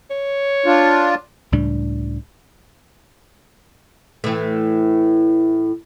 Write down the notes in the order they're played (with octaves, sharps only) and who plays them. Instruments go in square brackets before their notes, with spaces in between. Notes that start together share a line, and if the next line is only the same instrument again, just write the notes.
[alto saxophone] C#5
[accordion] D4 F4
[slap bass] C#2 A2 G3 D4
[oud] A2 E3